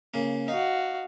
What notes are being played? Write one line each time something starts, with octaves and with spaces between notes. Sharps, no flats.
C#3 A#3
D#4 F#4 F5